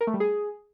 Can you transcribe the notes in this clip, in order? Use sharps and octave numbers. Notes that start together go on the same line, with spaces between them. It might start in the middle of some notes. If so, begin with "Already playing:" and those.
A#4
A3
G3
G#4